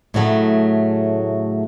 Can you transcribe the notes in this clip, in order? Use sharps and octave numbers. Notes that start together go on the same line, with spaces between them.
A2 C#3 F#3 A3